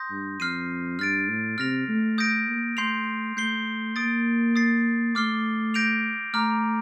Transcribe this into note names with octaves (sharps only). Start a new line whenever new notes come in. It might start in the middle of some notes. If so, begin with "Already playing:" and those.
Already playing: C6 D#6 G6 A#6
G2
F2 F6 C7 D#7
G2 F6 A6 D7
A2
C3 F6 A#6 F7
A3
D#6 G6 A#6 D7
A#3
A3 C6 G6 C7 F7
A3 G6 C7 G7
A#3 D#6 A6 D7
D#6 A6 C7
A3 D6 F6 C7 G7
G6 A#6 D7 F7
A3 A#5 D6 F6